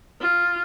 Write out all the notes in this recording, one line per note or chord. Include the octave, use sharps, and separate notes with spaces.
F4